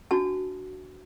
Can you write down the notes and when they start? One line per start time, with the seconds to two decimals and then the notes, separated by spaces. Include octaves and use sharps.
0.11 D4 F#4 A5